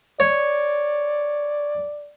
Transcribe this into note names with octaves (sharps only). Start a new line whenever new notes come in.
C#5 D5